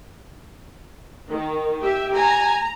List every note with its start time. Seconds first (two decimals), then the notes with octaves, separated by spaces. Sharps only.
1.30 D#3
1.83 G4 E5
2.16 G#5 A#5